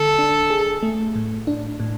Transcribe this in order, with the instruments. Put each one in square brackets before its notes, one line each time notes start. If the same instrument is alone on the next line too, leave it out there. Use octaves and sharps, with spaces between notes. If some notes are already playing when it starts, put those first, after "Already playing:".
Already playing: [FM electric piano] D3 [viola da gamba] A4
[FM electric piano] D4
G#4
A3
A2
D4
A2